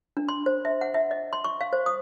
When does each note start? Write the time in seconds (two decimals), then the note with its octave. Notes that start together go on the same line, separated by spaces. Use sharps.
0.17 D4
0.29 C6
0.46 C5
0.65 E5
0.81 F#5
0.94 E5
1.11 D#5
1.33 C6
1.44 C#6
1.61 F5
1.73 C5
1.86 D#6